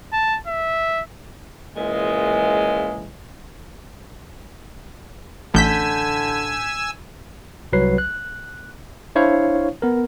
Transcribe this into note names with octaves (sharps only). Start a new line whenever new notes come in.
A5
E5
A#2 C#3 E3 G#3
A1 D3 G#5 E6 G6 B6
C2 F#3 B4 C7
F#6
D4 E4 C5 C#5 F5 C#6
B3 A#4